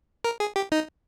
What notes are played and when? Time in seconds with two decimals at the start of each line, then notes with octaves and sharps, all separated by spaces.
0.24 A#4
0.40 G#4
0.56 G4
0.72 D#4